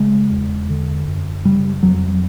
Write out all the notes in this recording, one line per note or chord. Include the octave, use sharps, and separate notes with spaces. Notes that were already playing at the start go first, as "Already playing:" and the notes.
Already playing: C#3 G#3
E2
D3
F#2
C#3 G3
F2 F#3